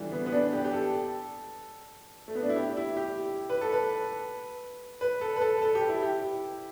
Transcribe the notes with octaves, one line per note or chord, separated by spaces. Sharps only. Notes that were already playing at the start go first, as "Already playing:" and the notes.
Already playing: D3 E3 G3
B3
B3
D4
G4
G4
A4
A3
B3
D4
E4
G4
E4
G4
B4
A4
B4
B4
A4
B4
A4
A4
G4
E4
G4